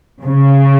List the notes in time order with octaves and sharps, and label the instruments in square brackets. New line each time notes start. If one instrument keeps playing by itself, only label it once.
[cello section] C#3